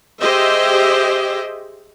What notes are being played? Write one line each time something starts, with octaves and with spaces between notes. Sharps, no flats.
G4 G#4 C5 D#5 E5